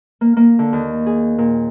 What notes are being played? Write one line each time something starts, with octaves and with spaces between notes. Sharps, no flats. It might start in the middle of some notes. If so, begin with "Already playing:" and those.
A#3
A#3
D3
D#2
G#4
A#2